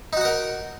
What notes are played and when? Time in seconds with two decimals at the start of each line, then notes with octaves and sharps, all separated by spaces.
0.13 D#4
0.17 F#4
0.21 F#5
0.25 A#4